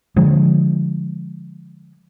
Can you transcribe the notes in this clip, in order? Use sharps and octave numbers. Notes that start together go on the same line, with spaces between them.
D3 F3 G#3